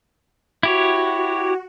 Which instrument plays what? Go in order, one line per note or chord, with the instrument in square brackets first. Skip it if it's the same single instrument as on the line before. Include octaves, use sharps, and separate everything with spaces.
[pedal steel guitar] E4 G4 C#5 [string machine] F#4